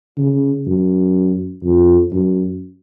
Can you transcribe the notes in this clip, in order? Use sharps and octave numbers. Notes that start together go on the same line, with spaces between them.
C#3
F#2
F2
F#2